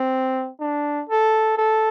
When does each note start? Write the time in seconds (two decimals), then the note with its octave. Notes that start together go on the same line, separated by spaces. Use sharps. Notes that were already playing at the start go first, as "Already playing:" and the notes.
Already playing: C4
0.60 D4
1.09 A4
1.57 A4